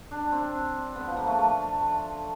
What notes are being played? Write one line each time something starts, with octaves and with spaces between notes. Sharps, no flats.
D4
C4
B3
F3
A#3
A3
A3